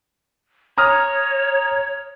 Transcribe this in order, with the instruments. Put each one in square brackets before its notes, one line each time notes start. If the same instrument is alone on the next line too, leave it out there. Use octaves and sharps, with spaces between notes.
[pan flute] C#5 [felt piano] A#5 D#6 F6